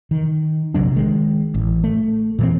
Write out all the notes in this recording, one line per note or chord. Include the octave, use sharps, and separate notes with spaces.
D#3
A#1 C3 F#3 D4
D#3 G#3
A1
A3
A#2 E3 C4